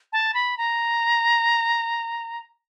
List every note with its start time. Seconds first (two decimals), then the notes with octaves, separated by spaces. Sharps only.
0.13 A5
0.34 B5
0.58 A#5